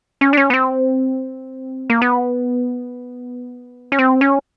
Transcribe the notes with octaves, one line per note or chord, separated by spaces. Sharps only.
C#4
D4
C#4
B3
C4
A#3
B3
C#4
C4
C#4